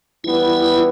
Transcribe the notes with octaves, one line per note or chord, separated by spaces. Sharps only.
E3 G3 B3 E4